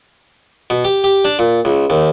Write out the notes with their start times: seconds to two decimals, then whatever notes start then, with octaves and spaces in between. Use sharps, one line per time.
0.70 B2
0.84 G4
1.04 G4
1.25 D4
1.39 A#2
1.65 C#2
1.90 D#2